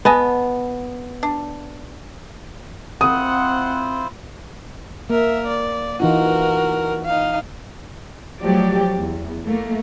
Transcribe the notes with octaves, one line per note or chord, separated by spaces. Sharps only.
B3 D#5 G#5 A5
D4
C4 E4 F4 C5 F#5 D#6
A#3 A#4 E5
D5
E3 D#4 F4 F#4 A#4
D#4 F5
F3 F#3 A3 G4 D5
E2
A3 A#3